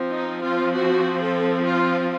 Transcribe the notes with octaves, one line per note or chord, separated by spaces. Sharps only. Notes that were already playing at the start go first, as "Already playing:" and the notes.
Already playing: F3 C4
D#4
F4
F#4
A4
F4